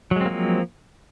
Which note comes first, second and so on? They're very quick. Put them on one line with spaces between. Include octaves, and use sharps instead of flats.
F#3 G#3 C4 A#3 F3